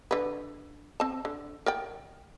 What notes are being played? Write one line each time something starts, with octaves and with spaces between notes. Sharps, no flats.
D3 B4
C4 A5
D3
A#4 D5 G5